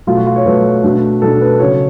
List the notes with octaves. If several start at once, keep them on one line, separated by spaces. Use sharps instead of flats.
B2 F#3 A3 F4
F#4
F4
C#5
B2 F#3 A3 B4
B2 A3 D4
B2 A3 D4 A4
B4
C#3 F#3 C#4 C#5